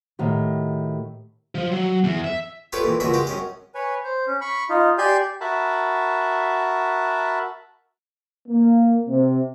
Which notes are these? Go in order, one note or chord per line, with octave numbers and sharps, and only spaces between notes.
A2 D#3 F#4 G4
F3
F#3
E2
E5
F4 G4 A4 B4 C#5 D5
A#2 E3
C#2 A#2 E3 F#4 D#5 E5
G#3 G4 D#5
F#2 C#4 D#5
B4 C#5 G#5
C5
C#4
B5 C#6
D#4 F4
G4 D5 G#5 C6 G6
F#4 A#4 E5 A5 B5
A#3
C3